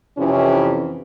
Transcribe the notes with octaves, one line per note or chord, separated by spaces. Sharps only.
F2 C3 E3 C#4